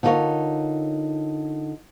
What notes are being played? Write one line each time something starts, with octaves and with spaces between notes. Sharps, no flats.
D3 D#4 F4 G4 A#4 C#5